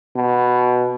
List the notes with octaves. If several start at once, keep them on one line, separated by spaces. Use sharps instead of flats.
B2